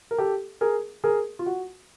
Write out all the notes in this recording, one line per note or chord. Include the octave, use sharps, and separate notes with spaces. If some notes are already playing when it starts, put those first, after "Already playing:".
A#4
G4 A4
G#4 A#4
G#4 A#4
F4
F#4